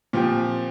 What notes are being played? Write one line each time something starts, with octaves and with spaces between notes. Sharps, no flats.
A#2 F3 C4 G4